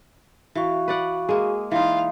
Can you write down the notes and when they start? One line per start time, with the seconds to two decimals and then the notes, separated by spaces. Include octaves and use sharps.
0.56 E3 F#4 F5 C#6
0.88 B4 D5 F#5
1.29 G#3 A#3 G#4
1.72 E3 D#4 F4 F5